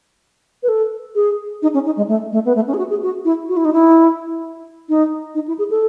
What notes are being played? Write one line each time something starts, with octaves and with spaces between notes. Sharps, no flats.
B4
A4
G#4
D#4
C#4
D#4
G#3
A3
A3
B3
A3
C#4
G#4
F#4
G#4
F#4
E4
F#4
E4
D#4
E4
D#4
D#4
E4
G#4
A4